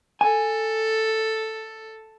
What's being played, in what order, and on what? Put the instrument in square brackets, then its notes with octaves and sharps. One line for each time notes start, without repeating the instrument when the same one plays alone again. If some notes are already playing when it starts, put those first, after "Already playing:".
[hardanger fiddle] A4 [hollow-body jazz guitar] G#5